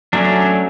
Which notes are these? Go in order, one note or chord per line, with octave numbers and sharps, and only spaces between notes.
F#3 A3 C#4 D4